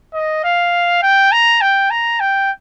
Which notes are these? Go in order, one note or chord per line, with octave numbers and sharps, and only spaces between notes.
D#5
F5
G5
A#5
G5
A#5
G5